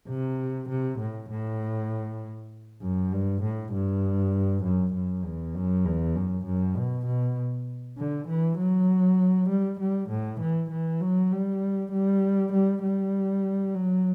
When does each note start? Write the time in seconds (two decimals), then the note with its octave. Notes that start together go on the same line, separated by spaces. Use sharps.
0.08 C3
0.69 C3
0.99 A2
1.30 A2
2.81 F#2
3.12 G2
3.43 A2
3.73 G2
4.64 F#2
4.94 F#2
5.24 E2
5.55 F#2
5.85 E2
6.15 F#2
6.46 F#2
6.76 B2
7.06 B2
7.97 D3
8.28 E3
8.58 F#3
9.49 G3
9.80 G3
10.10 A2
10.41 E3
10.70 E3
11.01 F#3
11.31 G3
11.92 G3
12.53 G3
12.83 G3
13.75 F#3